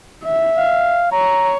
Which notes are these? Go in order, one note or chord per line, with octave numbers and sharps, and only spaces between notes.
E5
F5
C#5 A#5